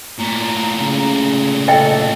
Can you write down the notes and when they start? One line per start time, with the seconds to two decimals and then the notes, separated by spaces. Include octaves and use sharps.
0.19 A#2 A3 A#5
0.80 C#3
1.68 A4 D#5 E5 G5